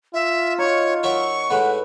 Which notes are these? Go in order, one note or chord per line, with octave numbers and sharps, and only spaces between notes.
F4 E5
D#4 F#4 C#5
F#3 A#4 E5 C#6
A2 G#3 A3 F#4 B4 F#5